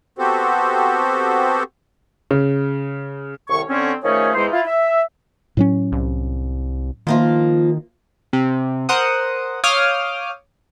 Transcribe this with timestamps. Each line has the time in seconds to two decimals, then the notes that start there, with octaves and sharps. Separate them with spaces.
0.19 B3 C4 F#4 G4 A4 C5
2.31 C#3
3.49 C2 A2 D#3 C#5 C#6
3.69 D3 C4 C#4
4.03 D#3 F3 A3 C#4 G#4 C#5
4.34 E2 E3 G#3 D#4 C5
4.52 E4 F4
4.66 E5
5.57 A2 F#3 C#4
5.92 C2
7.07 D#3 F3 A#3 F4
8.33 C3
8.89 A#4 C5 F#5 D#6
9.64 C#5 F5 D6 D#6 F6 G6